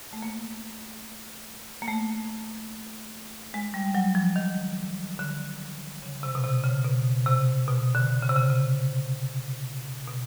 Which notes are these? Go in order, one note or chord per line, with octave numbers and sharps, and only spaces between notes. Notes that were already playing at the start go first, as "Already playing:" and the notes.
A3
A#3
A#3
A3
G#3
G3
F#3
F3
D#3
D3
C#3
C3
B2
C3
C#3
B2
C3
B2
D3
C#3
C3
C#3
C3
B2